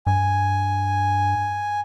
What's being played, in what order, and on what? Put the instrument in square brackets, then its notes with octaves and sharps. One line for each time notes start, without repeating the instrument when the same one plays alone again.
[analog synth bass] G2 [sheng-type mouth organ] G#5